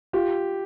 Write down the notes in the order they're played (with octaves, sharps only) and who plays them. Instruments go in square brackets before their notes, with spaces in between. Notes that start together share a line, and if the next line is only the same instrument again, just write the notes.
[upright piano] F4 [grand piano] G4